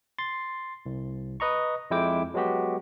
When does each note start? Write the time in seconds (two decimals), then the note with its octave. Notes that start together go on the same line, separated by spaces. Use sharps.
0.19 C6 A6
0.86 C2
1.40 B4 D#5 A#5 C#6
1.91 F2 G#3 E4 G5 D6
2.34 F#3 G#3 B3 F#4 G4